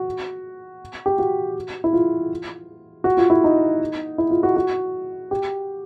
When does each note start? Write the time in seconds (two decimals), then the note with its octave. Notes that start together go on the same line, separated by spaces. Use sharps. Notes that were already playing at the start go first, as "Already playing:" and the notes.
Already playing: F#4
1.06 G4
1.19 F#4
1.84 E4
1.93 F4
3.04 F#4
3.17 F4
3.30 E4
3.44 D#4
4.18 E4
4.31 F4
4.43 F#4
4.56 F#4
5.31 G4